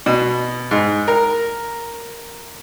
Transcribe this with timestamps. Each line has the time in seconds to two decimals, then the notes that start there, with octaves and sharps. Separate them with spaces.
0.06 B2
0.71 G#2
1.08 A#4